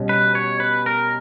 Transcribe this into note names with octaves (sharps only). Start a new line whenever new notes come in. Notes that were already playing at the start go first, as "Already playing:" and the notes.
Already playing: B2 G3 C#4
B4
C#5
B4
A#4